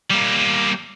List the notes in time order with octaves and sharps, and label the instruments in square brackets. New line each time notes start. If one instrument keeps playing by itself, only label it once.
[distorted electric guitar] G3 A#3